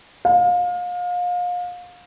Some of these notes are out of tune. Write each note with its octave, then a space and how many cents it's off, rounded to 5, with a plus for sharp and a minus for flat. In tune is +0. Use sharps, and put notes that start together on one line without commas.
F5 +30